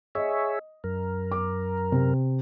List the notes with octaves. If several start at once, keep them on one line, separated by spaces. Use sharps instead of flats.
G#4 C#5 D#5 E5
F#2 A#4
D6
C3